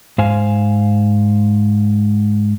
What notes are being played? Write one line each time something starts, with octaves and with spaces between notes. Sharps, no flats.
G#2 C5 F5 G#5